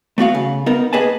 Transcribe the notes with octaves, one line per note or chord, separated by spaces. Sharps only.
A3 B3 F#4 F5
C#3
B3 D#4 A#4
A#3 G#4 B4 D#5 G#5 A5